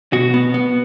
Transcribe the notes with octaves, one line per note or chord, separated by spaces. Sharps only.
B2 F#4
B3
B3